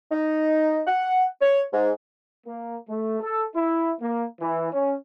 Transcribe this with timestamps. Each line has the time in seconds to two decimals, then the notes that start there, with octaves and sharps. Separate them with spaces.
0.11 D#4
0.87 F#5
1.41 C#5
1.73 G#2
2.46 A#3
2.88 A3
3.21 A4
3.55 E4
4.00 A#3
4.40 E3
4.71 C#4